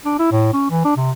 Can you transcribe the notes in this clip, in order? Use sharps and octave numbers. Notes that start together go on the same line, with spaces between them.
D4
E4
A2
C#4
E3
D4
C3